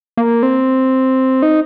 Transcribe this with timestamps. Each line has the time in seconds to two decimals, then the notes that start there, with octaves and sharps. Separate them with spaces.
0.17 A#3
0.43 C4
1.42 D#4